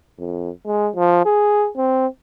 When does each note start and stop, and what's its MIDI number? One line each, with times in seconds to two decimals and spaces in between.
0.19 0.50 41
0.66 0.90 56
0.95 1.23 53
1.25 1.69 68
1.77 2.07 60